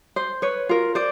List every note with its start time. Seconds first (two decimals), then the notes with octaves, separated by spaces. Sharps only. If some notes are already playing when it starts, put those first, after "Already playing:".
0.16 C5
0.42 B4 C#5
0.69 F4 A#4
0.95 C5 D5